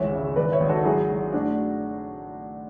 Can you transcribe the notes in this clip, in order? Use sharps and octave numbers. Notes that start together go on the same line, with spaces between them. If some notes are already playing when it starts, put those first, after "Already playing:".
Already playing: G#1 C#2 E3 C#5 E5
C#3
G#1 B4 D5
C#5 E5
G#1
F#4 A4
F#3 E4 G#4
F#3
A2 D4 F#4